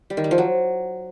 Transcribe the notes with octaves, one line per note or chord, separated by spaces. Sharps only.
G3
D#3
G3
F3
F#3